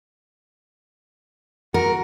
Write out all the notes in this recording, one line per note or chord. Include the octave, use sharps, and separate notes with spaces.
F#4 A#4